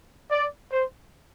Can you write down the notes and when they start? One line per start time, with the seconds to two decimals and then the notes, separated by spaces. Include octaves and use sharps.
0.31 D5
0.71 C5